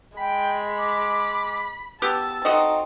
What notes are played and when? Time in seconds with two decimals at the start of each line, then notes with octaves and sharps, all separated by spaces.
0.17 G#3 G5 B5
0.78 D6
2.02 B3 G4 A5 E6
2.45 C4 D#4 F#4 A4 D#5